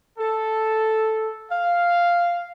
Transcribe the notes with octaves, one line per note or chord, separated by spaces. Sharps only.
A4
F5